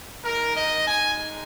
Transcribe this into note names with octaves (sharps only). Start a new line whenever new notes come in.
G#3 D#4 A#4
D#5
G#5